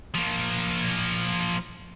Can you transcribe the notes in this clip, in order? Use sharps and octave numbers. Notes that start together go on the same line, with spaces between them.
F3 A#3